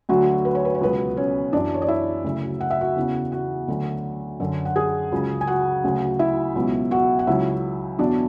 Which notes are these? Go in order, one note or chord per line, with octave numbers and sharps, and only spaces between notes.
D2 D3 F#3 F#4
B4
C#5
B4
C#5
C#2 B2 F#3 B3 B4
C#4 C#5
F#2 E3 D4 D5
C#5
D5
E4 E5
D2 C#3 F#3
F#5
E5
F#4 F#5
E2 C#3 E3
F#4 F#5
D2 D3 F#3
F#2 D3 F#3
F#5
G#4 G#5
C#2 C#3 F#3
G#5
F#4 F#5
D2 C#3 F#3
E4 E5
C#2 B2 F#3
F#4 F#5
F#5
C#2 C#3 F#3 E4 E5
E2 B2 F#3 D4 D5